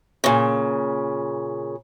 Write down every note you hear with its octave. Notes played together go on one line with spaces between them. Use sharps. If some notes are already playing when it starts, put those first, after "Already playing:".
A#2 C#3